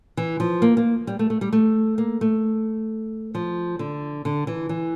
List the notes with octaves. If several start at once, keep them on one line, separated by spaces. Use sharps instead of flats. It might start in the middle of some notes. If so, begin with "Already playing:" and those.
E3
F3
A#3
A#3
G3
A3
A3
G3
A3
A#3
A3
F3
D3
D3
E3
E3